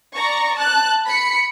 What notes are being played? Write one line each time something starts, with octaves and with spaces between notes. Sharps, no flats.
D5 A#5 C#6
A5 F#6
B5 B6 C#7